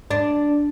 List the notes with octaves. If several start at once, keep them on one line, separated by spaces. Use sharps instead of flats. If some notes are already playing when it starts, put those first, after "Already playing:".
D4